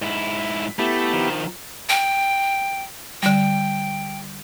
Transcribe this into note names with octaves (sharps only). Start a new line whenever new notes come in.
G#2 E4
A3 B3 E4 G4
D#3 F3
G5
D3 G3 G5